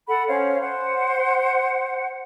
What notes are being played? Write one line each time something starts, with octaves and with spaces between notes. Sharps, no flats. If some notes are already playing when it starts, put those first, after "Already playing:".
A4 F#5 B5
C#4 C5 C#5 F5
C5 F#5